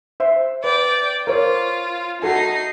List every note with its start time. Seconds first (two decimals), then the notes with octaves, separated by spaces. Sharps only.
0.20 C5 E5 C6
0.64 B4 D5 G5
1.27 F4 A#4 C5 C#5
2.22 D#4 F#4 A4 G#5 C7